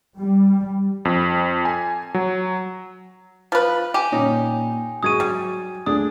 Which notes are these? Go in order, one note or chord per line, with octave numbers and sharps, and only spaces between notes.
G3
F2
G#5
F#3
F3 B4
G4 G#5
A#2 C#4 D#4
G#2 F#3 G#4 C#6 D#6 G#6 D#7
F#3 G3
D2 D4 G#4 D#6